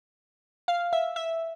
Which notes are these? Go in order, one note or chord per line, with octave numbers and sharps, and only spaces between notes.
F5
E5
E5